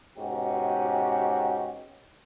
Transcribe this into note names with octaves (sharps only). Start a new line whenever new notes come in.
G#2 B2 C#4 F#4 G4